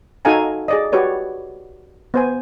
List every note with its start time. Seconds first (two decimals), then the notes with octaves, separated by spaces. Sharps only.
0.25 D#4 F#4 A4 F5 G#5 A#5
0.68 G#4 D5 D#5
0.92 F#4 G4 B4 C#5 D5
2.14 B3 C5 G#5